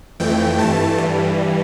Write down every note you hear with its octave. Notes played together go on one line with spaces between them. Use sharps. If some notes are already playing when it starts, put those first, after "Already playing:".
F2 E3 A3 G5
G2 E3 A3 A5
G2 E3 G3